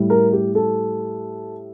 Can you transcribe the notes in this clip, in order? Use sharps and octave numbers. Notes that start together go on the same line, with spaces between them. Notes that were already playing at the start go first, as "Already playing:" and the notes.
Already playing: A2 G3
A#4
G4
A4